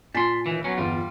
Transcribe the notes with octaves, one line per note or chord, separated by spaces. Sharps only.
A#2 G#5 A5 C6 B6
D#2 E3
F#3 B3 C#4
G1 E2 G3 F4